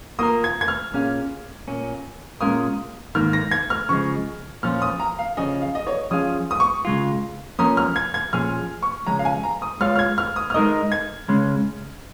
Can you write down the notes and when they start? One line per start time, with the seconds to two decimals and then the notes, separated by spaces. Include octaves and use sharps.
0.19 A#3 F4 A#4 D#6
0.44 G#6
0.61 G#6
0.68 F6
0.93 A#2 A#3 C#4 G#4 F5
1.68 A#2 A#3 C#4
2.41 A#2 G#3 C#4 A#4 F5 D#6
3.15 G#2 D#3 A#3 F6
3.33 A#6
3.51 G#6
3.70 F6
3.89 C#3 F3 G#3 C#6
4.63 A#2 F3 C#4 F4 F6
4.82 D#6
5.00 A#5
5.19 F5
5.37 C#3 F3 C#4 G#4 D#5
5.62 F5
5.75 D#5
5.87 C#5
6.11 F3 C#4 G#4 F5 D#6
6.51 D#6
6.60 C#6
6.85 C#3 G#3 F4
7.59 F3 A#3 C#4 A#4 D#6
7.77 F6
7.96 G#6
8.14 G#6
8.33 A#2 F3 C#4 G#4 F6
8.82 C#6
9.07 C#3 F3 G#3 C#4 A#5
9.19 F5
9.25 G#5
9.44 A#5
9.62 D#6
9.81 G#3 F4 C#5 F5 F6
9.96 F6
9.99 G#6
10.18 F6
10.36 D#6
10.50 F6
10.54 G#3 D#4 A#4 D#5 D#6
10.92 G#6
11.28 C#3 G#3 C#4